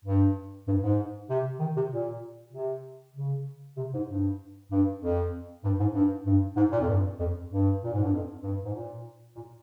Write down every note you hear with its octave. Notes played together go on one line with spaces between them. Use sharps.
G2
G2
G#2
C3
D#3
C3
A#2
C3
C#3
C3
G#2
G2
G2
F2
G2
G#2
G2
G2
G#2
A#2
F2
G2
F2
G2
A#2
G#2
G2
F2
G2
G#2
A#2
A#2